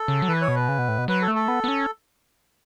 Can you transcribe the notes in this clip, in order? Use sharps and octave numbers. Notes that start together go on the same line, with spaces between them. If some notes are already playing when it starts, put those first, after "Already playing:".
Already playing: A4
C#3
F#3
E3 B4
C#5
B2
B4
C#3
B2
A2
B2
F#3 B4
A4
A3
A4
B3
B3
C#4